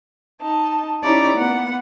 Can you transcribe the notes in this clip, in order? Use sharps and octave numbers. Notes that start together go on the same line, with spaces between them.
D#4 A5
C#4 D#4 E4 G4 D5 A#5
A#3 B3 F#5